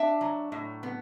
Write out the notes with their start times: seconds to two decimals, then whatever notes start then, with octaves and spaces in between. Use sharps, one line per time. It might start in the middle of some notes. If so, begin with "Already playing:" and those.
Already playing: D4 E5
0.21 F#3
0.52 A2
0.83 B3